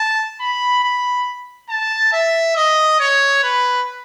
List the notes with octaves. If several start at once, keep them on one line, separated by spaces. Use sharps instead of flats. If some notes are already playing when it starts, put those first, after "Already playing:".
Already playing: A5
B5
B5
A5
E5
D#5
C#5
B4